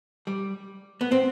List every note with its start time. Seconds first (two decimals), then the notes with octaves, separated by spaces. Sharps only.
0.27 G3
1.01 B3
1.12 C4